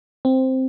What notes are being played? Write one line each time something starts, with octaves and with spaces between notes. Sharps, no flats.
C4